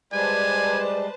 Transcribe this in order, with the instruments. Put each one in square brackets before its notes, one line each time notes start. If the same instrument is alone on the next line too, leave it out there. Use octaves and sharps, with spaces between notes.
[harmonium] G3 G#3 [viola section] B4 C5 A5 [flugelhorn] D5 [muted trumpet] G#5